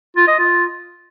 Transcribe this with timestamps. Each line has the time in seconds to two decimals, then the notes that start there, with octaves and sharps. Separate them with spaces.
0.17 F4
0.28 D#5
0.39 F4